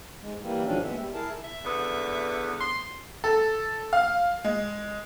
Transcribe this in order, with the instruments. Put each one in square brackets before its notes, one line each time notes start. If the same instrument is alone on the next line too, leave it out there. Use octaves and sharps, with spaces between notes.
[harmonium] G#2 G#3
E3 G3 A#3
G#2 B2 D#3 F3 C#4 D4
D#2 G#3 B3 E5
G3
E4 G#4 A#4 A5
[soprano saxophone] E5
[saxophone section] E2 D3 B3
[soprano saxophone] C6
[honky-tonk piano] A4
F5
G#3